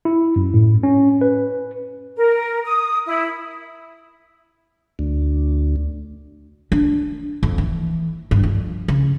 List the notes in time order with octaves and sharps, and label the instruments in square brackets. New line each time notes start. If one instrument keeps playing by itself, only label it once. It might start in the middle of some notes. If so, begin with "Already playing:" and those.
[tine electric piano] E4
F#2
A2
C#4
B4
[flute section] A#4
D#6
E4
[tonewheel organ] D2
[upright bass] D4
F2
E3
G2
F2
C#3